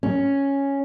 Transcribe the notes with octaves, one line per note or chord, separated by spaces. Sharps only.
C#4